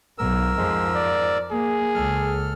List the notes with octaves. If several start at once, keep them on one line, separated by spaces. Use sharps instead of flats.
B1 G#2 A#4 E6
F2 F3 G#3
D5
A#3 G#4
C#2 A4 F6